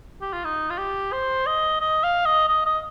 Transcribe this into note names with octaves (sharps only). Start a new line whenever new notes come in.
G4
F4
D#4
F4
G4
C5
D#5
D#5
F5
D#5
D#5
D#5